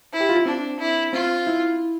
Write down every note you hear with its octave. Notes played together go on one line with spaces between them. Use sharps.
E4
G4
F4
E4
C4 D4
E4
C4 F4
E4